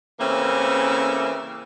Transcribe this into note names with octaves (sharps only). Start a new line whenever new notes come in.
C#3 E3 A3 A#3 C4 C#4